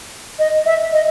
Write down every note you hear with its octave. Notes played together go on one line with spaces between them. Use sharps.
D#5
E5
D#5